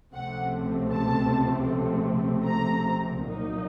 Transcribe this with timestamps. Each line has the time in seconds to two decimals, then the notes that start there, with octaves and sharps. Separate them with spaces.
0.13 C#2 C3 F3 A3 C4 F#5
0.92 A5
2.45 A#5
3.23 C2 A#2 F#3 A#3 D#4